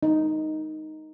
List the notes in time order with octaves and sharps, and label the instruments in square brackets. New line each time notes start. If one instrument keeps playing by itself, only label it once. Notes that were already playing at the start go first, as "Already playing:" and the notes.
[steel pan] D#4